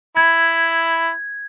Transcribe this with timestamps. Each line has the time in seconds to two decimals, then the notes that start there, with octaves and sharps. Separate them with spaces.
0.17 E4 G#6